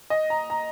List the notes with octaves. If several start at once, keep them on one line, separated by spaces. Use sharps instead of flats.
D#5
A#5
A#5